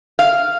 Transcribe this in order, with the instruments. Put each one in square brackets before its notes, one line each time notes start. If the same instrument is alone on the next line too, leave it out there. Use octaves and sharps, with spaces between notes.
[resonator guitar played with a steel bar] F5